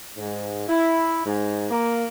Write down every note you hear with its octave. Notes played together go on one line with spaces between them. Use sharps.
G#2
E4
G#2
A#3